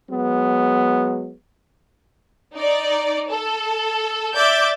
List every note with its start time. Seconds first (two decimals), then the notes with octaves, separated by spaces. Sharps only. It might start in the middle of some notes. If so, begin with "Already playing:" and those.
0.11 F#3 G#3 B3
2.56 D#4 D5
3.30 A4
4.36 D5 E5 D6 G6 A6